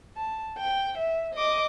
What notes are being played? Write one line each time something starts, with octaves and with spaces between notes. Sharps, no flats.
A5
G5
E5
D#5 D6